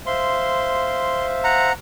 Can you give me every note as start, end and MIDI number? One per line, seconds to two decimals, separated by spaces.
0.07 1.70 72
0.07 1.70 76
0.07 1.70 77
0.07 1.26 84
1.44 1.73 78
1.44 1.73 82